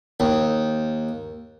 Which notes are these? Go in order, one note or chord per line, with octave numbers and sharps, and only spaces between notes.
D#2